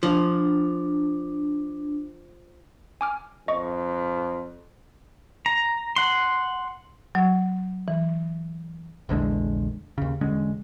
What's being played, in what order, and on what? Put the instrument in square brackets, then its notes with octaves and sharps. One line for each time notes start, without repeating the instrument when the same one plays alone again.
[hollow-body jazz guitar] F3 [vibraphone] D4
[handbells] G#5 D6 F6
[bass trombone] F2 [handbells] D#5 C#6
[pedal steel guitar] A#5
F#5 C6
[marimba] F#3
E3
[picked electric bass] A#1 E2 D3 G#3
D#2 C#3
E1 D3 G#3 C#4